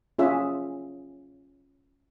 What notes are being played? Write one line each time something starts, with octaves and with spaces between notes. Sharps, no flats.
C#4 F4 G#4 E5